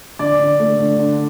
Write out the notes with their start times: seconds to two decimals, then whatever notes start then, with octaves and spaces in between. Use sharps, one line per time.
0.19 D3 D5
0.39 D3
0.60 A3
0.79 D3
0.99 D3